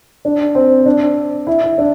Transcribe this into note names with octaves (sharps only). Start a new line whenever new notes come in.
D4
C4
D4
E4
E4
D4